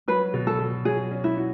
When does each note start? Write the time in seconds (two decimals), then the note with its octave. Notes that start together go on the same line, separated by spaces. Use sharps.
0.08 F#3 B4
0.34 B2
0.47 A4
0.60 B2
0.85 F#3 G#4
1.11 C#4
1.24 E4
1.37 F#4